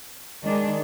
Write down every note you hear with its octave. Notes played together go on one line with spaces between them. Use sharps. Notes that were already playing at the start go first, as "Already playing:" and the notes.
D#3 G#3 D4